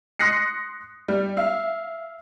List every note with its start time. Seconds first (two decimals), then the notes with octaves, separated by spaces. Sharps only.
0.19 C6 D#6 F#6 A#6 C7 C#7
1.08 G3
1.37 E5 F5